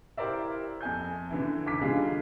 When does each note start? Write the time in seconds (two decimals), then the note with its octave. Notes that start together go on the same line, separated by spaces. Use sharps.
0.17 E4 G4 A#4 C5 D5 E5
0.81 F2 G#5 G6
1.30 D3 E3 E4
1.66 D#2 D6 B6
1.81 D3 G3 D#4 F4 G#4